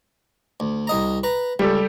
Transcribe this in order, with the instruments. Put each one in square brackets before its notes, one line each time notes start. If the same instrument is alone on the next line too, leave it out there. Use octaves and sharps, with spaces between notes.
[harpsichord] D2
C2 D#5 A#5
B4 A#5
[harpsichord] C#2 [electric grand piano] G3 G4 A4